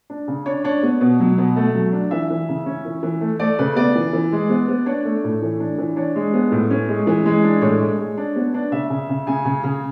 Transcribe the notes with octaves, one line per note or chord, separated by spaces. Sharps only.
D4
C#3
D4 C#5
D4 C#5
B3
B2
F#3
B2
A3
F#3
D4
E3 E5
E3
C#3
C#4
E3
E3
A3
A3 D5
C#3 B4
B3 D5
E3
E3
G#3
B3
B3
D4 C#5
A3
A2
E3
D4
E3
D4 C#5
G#3
B3
A2
C#4
G#3
E3
G#3
D4
A2 C#5
G#3
G#3
D4
B3
D4
C#3 E5
C#3
C#3
C#3 G#5
C#3
C#3